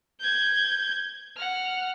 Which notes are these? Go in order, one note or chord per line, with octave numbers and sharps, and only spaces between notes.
G6 G#6
F#5 F6